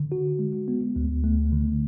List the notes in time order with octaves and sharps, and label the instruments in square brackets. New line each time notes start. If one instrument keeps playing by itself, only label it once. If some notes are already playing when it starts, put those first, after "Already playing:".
Already playing: [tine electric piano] D3
F#4
G#3
B3
D2
A3
D3